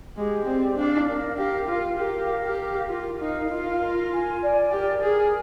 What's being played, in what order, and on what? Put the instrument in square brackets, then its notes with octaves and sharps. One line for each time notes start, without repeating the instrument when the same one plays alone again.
[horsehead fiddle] G#3 [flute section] G4
[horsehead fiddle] C4 [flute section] D5
[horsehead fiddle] D4 [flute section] F5
[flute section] A#4
[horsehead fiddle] G4 [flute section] F5
[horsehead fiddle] F4 [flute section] F5
[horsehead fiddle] G4 [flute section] A#4
[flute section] F5
[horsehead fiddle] G4
[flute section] A#4
[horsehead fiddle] F4 [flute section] A#4
[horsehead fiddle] D#4 [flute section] F5
[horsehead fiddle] F4 [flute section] A#4
[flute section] A#4
G#5
D5
[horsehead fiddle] G4 [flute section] A#4
[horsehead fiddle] G#4 [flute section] A#4